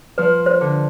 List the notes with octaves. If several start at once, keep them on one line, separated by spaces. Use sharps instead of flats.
F3 B4
C5
D3